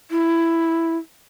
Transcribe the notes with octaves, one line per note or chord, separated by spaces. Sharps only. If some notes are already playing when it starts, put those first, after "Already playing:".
E4